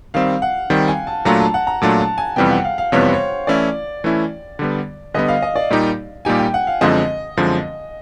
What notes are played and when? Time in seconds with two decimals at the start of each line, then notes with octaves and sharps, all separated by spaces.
0.14 D#3 G3 C4 F5
0.42 F#5
0.70 D#3 G3 C4 G5
0.88 G#5
1.07 A5
1.25 A#2 F#3 A3 D4 F4 A#5
1.40 A5
1.54 F#5
1.67 A#5
1.82 A#2 F#3 A3 D4 F4 A5
2.00 A5
2.18 G#5
2.36 F2 C3 E3 G3 B3 G5
2.51 F#5
2.65 F5
2.78 F5
2.92 F2 C3 E3 G3 B3 C#5
3.03 C5
3.14 C#5
3.47 E3 A3 C#4 E4 D5
4.04 E3 A3 C#4 E4
4.59 D3 G3 B3
5.14 D3 G3 B3 D#5
5.28 F5
5.42 D#5
5.56 D5
5.70 A#2 G3 A#3 D#4 G4
6.25 A#2 G3 A#3 D#4 G4 G#5
6.39 G5
6.54 F#5
6.67 F5
6.81 F#2 D3 F3 G#3 C4 D#5
7.37 F#2 D3 F3 G#3 C4